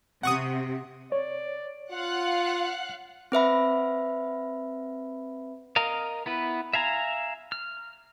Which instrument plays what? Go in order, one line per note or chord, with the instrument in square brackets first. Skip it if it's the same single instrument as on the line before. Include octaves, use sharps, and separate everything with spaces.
[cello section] C3 [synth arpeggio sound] F#5 C#6 D#6
[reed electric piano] C#5 [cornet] D5
[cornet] F4 [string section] F5 F#5 F#6
[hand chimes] C4 B4 E5 B5
[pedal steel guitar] A#4 D#5 F5
B3 E4 B4
E5 F5 G#5 A#5
F6